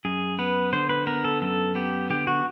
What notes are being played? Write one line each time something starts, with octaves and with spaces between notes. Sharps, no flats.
F#2 G#4
B3 B4
D3 C5
B4
B3 A#4
A4
F#2 A4
B3 G4
D3 G4
F#4